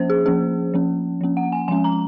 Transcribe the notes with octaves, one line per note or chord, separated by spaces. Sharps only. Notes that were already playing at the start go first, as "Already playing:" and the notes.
Already playing: F3 A#3 C#4 C5
G#4
F3 A#3 C#4 G#4
F3 A#3 C#4
F3 A#3 C#4
F#5
G#5
F3 G#3 C#4 G#5
A#5